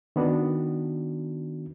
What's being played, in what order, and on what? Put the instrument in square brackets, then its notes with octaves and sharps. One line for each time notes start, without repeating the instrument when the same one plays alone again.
[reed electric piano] D#3 B3 D4 F#4